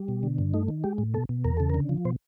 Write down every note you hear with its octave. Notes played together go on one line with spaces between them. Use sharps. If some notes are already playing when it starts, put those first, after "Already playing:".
Already playing: G3
B2
D3
G2
A3 D#4
D#3
G#3 G4
A2
B2 A4
B2
E2 A#4
C#3 A4
D3 A#4
F3
B2 C5